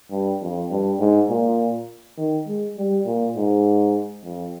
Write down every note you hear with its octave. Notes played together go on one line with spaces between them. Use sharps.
G2
F2
G2
G#2
A#2
D#3
G#3
G3
A#2
G#2
F2